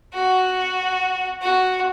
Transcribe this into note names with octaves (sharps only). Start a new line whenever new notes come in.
F#4
F#4